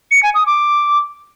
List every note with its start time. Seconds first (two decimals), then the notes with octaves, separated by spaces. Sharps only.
0.11 C#7
0.23 G#5
0.35 D#6
0.46 D6